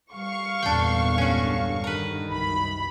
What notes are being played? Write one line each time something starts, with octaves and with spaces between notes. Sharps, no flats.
G3 F5 C#6
G#1 E2 G2 A#2 D3 D4 G5
C#4 F#4
D#3 A#4 B4
C2 F#2 B5